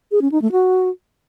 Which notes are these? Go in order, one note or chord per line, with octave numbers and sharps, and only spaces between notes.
G#4
C#4
D#4
A3
F#4